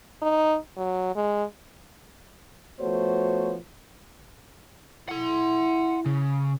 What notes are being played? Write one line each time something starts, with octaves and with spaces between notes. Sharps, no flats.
D#4
F#3
G#3
F3 A3 B3 F#4 C5 C#5
E4 F#5 C6
C#3